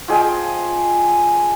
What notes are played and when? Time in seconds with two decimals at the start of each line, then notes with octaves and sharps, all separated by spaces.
0.08 F3 G#4 D#5 G5